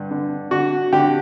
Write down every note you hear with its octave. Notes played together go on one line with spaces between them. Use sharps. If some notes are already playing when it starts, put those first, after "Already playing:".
Already playing: G2 D3
D3
D3 F#4
D3 G4